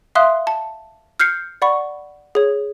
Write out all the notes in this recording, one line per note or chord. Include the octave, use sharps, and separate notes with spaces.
E5 F5 C6 D#6 F#6
A5
F6 G6 C7 C#7
D5 F#5 B5 C#6
G#4 C#5